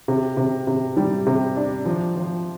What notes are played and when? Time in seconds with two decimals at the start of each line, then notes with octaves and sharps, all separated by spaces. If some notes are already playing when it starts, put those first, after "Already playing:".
0.08 C3
0.37 C3
0.67 C3
0.97 G3
1.26 C3
1.56 D4
1.86 F3
2.16 F3